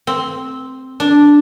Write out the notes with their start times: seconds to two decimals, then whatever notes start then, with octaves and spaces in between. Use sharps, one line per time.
0.07 C4
1.00 D4